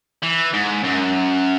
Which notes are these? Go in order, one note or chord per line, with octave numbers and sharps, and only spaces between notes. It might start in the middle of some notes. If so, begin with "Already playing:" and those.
E3
G#2
F#2